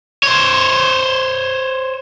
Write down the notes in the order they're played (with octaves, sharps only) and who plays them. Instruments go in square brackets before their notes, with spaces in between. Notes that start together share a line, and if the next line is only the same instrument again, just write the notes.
[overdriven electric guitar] C5 C#5